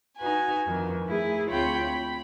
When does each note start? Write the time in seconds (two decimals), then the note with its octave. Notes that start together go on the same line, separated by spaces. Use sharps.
0.18 D#4 F#4 B4 G#5
0.67 F2 D#3 E3
1.09 A3 E4 G#4
1.50 D2 C4 F4 C#5 G5 B5
1.83 B5